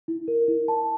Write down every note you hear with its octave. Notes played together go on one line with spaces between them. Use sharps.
E4
A#4
E4
A5